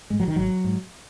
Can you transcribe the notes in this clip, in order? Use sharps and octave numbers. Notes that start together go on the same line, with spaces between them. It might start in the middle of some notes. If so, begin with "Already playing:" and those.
G#2 G#3
F#3
D#3
G#1 F#3
G#2